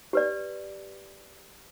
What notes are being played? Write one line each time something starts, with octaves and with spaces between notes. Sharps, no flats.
G4 B4 D5